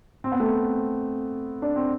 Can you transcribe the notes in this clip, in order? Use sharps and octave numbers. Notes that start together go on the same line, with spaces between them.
C4
B3
A3 C4
D4
C4